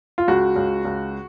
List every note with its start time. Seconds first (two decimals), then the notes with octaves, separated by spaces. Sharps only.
0.18 F4
0.28 C#2 F#4
0.56 C#2
0.85 C#2